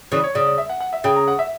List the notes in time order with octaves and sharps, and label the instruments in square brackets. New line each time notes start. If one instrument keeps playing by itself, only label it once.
[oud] C#3 E3 [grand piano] D5
[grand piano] C#5
[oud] C#3 [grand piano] D5
[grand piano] D5
E5
F#5
F#5
E5
[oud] C#3 [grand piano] G5
[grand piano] A#5
F#5
E5